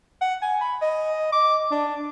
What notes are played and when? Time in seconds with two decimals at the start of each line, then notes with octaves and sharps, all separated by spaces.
0.21 F#5
0.42 G#5
0.61 B5
0.82 D#5
1.32 D6
1.71 D4